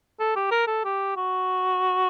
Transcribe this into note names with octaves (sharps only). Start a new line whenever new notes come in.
A4
G4
A#4
A4
G4
F#4